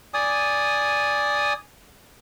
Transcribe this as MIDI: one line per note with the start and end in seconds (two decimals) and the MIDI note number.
0.14 1.53 74
0.14 1.53 80
0.14 1.53 87